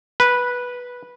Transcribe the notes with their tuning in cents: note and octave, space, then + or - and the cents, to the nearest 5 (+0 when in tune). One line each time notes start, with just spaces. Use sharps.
B4 -10